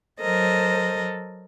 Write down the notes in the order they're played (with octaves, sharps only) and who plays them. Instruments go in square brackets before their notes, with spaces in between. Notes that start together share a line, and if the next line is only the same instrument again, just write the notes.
[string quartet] F#3 A4 A#4 C5 D#5